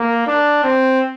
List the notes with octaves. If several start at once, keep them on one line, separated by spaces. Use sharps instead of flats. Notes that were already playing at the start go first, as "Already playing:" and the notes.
Already playing: A#3
D4
C4